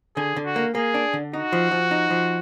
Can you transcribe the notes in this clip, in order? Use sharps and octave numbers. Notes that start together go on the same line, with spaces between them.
D3 G#4
D3
F#4
A#3
A#3 G#4
D4
D3
D#4 F#4
F3
F3
D#4
F3